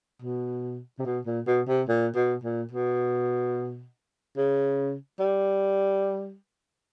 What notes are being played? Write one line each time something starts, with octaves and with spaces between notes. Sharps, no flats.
B2
C3
B2
A#2
B2
C3
A#2
B2
A#2
B2
C#3
G3